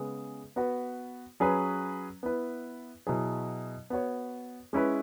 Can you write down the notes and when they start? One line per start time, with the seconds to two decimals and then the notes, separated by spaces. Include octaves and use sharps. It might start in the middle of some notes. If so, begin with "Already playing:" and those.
Already playing: C#3 G#3 B3 G#4
0.56 B3 F#4 B4
1.40 F#3 C#4 G#4 B4
2.23 B3 E4 B4
3.07 B2 F#3 E4 G#4 B4
3.90 B3 F#4 C#5
4.73 G#3 C#4 E4 B4